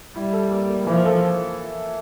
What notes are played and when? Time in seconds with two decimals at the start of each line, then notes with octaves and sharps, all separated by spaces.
0.16 G3 E4
0.33 A4
0.51 A#3
0.70 A#3
0.87 E3 F3
1.05 A4